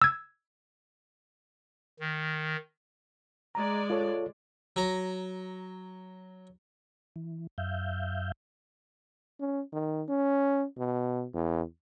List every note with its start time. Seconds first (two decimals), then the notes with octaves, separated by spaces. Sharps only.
0.02 E6 G#6
2.00 D#3
3.55 G#3 D5 A#5
3.90 F4 A4 C#5
4.76 F#3 A#5
7.16 E3
7.58 F#2 E5 F5 G6
9.40 C#4
9.72 D#3
10.09 C#4
10.77 B2
11.34 E2